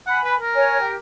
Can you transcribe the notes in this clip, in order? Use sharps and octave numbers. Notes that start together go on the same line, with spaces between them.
F#5 G#5 B5
B4
A#4
C#5 G#5
G4